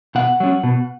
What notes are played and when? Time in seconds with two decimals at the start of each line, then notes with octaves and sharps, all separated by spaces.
0.15 B2 F#5
0.40 F#3 C#4
0.63 B2